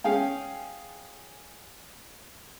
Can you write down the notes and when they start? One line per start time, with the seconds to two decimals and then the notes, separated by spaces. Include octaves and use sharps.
0.04 C#4 G#4 F5 G5